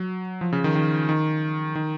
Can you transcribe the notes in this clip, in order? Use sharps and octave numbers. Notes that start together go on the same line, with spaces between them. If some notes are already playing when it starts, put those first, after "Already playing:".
Already playing: F#3
F3
C#3
D#3
D#3
D#3
D#3